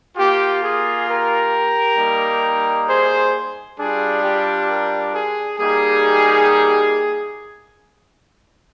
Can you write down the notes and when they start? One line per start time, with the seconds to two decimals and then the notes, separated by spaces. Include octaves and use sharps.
0.17 A#3 F4 G4
0.62 G#4
1.08 G4 A#4
1.98 G3 A#3 D#4
2.88 G#4 C5
3.79 G3 D4 F4 G#4
4.24 G4
4.69 G4 A#4
5.14 G#4
5.59 G3 A#3 D#4 G4 G#4